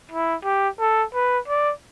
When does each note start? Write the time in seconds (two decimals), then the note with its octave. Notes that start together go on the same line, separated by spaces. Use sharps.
0.11 E4
0.45 G4
0.80 A4
1.14 B4
1.48 D5